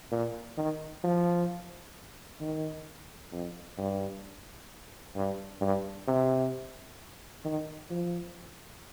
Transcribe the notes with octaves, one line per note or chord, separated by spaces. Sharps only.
A#2
D#3
F3
D#3
F2
G2
G2
G2
C3
D#3
F3